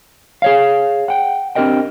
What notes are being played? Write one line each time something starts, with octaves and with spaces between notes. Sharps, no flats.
G#4 C#5 F5
F#5 G5
C4 D4 G4 A#4 D#5 G5